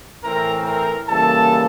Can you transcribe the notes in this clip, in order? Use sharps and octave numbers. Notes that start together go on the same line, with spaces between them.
A2 E3 A3 C4 A#4 A#5
A#4 A#5
C#3 E3 G3 A#3 A4 A5